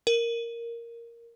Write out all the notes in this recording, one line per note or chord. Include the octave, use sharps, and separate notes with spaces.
A#4